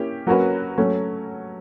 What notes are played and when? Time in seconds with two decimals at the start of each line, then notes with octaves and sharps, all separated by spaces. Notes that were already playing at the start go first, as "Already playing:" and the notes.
Already playing: A#3 C#4 E4 G4
0.27 F#3 A#3 C#4 F#4 B4
0.78 F#3 A3 C#4